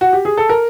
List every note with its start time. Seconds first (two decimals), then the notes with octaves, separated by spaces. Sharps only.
0.01 F#4
0.13 G4
0.25 G#4
0.37 A4
0.49 A#4